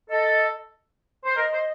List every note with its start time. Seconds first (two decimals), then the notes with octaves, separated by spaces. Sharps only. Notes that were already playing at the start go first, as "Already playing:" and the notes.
0.10 A4 D#5
1.25 C5
1.36 A#4 D#5
1.52 C5